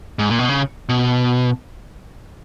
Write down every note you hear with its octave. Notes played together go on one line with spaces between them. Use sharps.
G#2
A#2
B2
C#3
B2